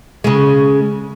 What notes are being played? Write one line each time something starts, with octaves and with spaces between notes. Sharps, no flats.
C#3 G#3